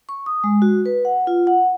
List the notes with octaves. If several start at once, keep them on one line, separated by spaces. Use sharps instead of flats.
C#6
D#6
G#3
F#4
B4
F#5
F4
F#5